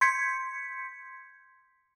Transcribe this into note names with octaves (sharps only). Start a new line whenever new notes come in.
C6 G6 G#6 B6 C#7